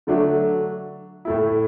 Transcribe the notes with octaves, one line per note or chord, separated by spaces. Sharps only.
D3 F#3 A3 D4
A2 A3 E4